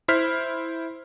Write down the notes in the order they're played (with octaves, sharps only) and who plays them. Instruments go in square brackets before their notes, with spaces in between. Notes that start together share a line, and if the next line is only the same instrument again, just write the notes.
[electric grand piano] E4 C5 F6 B6